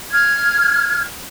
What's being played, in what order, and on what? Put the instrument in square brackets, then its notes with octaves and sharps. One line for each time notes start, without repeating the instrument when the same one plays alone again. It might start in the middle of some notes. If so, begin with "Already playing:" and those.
[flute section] F6 G#6